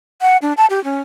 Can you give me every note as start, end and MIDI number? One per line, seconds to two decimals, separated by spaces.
0.22 0.37 78
0.42 0.53 62
0.57 0.66 81
0.70 0.83 67
0.84 1.01 61